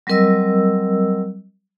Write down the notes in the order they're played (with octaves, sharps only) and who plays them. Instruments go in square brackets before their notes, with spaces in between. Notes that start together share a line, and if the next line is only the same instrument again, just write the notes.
[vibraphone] F#3 G3 C4 A#4 D#5 E6